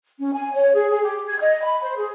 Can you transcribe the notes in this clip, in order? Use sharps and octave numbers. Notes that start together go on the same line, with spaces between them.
C#4
G#5
C#5
G#4
G#4
G4
G#6
D#5
B5
C5
G#4